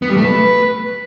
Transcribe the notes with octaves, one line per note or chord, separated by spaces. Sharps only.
B3
G3
A3
B4